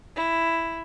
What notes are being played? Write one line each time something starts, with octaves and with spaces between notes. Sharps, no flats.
E4